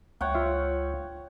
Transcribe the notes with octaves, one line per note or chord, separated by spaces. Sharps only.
C#2 C#5 F#5 G5
F4 E5 F5